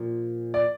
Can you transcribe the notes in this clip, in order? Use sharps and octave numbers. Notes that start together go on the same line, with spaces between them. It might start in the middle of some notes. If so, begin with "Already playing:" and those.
Already playing: A#2 F3
D5